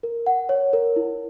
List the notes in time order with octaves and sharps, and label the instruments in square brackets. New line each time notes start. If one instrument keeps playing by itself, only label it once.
[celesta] A#4
F#5
C#5
A#4
E4